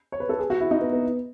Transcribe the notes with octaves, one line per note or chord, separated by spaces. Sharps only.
C#5
B4
A4
G#4
F#4
E4
D#4
B3
B3